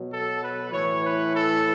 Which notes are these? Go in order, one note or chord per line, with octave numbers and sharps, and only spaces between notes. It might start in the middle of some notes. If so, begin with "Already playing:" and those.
Already playing: B2 F#3
A4
B4
A2 E3 C#5
B4
A4